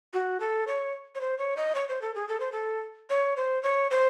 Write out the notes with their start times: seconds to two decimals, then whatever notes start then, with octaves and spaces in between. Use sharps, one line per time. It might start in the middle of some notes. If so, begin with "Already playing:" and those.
0.13 F#4
0.40 A4
0.67 C#5
1.15 C#5
1.21 C5
1.38 C#5
1.57 D#5
1.75 C#5
1.89 C5
2.01 A4
2.15 G#4
2.29 A4
2.40 C5
2.52 A4
3.10 C#5
3.37 C5
3.63 C#5
3.91 C5